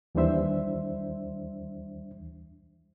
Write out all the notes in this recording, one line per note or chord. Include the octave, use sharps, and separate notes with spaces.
D#2 E3 G3 D4 C5 E5